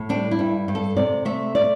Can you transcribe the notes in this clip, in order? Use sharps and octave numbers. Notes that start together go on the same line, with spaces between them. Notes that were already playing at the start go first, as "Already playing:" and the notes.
Already playing: A2
G3 D4
E4
G2
G2
A4
C3 D5
A3 E5
D5